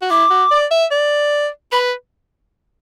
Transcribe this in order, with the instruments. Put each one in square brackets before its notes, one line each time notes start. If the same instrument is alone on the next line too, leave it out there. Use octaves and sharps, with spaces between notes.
[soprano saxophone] F#4
[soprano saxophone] E4 [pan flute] D6
[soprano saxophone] F#4
D5
E5
D5
[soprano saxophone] B4 [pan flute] B5